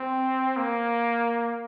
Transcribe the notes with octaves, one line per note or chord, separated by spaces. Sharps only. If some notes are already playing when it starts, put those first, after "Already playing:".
Already playing: C4
A#3